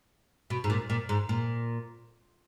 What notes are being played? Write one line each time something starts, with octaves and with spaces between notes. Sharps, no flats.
B2
G#2
A#2
A#2
G#2
A#2